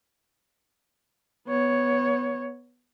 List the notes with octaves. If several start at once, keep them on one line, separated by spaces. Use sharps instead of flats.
B3 C#5